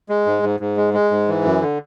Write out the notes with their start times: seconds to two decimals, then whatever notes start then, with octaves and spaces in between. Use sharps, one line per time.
0.09 G#3
0.26 G#2
0.43 G#2
0.60 G#2
0.77 G#3
0.94 G#3
1.11 G#2
1.28 E3
1.45 F#2
1.61 D3